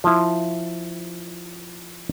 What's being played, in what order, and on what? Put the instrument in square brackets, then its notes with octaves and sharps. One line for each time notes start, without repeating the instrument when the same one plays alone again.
[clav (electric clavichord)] F3 E4